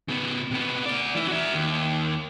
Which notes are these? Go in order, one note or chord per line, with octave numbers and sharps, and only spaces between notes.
C#3 B3
C3 B3
A3 D5
E3 E4
F#4 E5
D#2